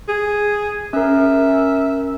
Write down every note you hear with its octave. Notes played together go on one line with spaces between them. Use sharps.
G#4
C#4 A#4 E5